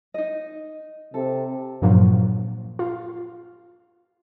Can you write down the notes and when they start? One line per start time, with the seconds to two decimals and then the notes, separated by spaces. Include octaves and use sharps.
0.14 D#4 D#5
1.14 C3 A4
1.82 G2 A#2 F3 F#3
2.79 F4